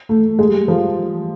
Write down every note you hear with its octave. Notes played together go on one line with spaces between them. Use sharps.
A3
G#3
G3
F3